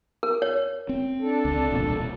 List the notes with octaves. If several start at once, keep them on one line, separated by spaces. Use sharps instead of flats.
A#4
C#5
C4
D4 A4
C#2 C4
E1 C2 A#2